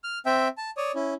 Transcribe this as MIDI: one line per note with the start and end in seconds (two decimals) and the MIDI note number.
0.04 0.19 89
0.26 0.48 60
0.26 0.48 76
0.26 0.48 79
0.57 0.70 81
0.77 0.92 73
0.77 0.92 74
0.77 0.92 87
0.95 1.14 61
0.95 1.14 64